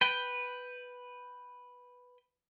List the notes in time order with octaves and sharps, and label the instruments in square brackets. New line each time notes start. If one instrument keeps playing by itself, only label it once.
[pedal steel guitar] B4 G5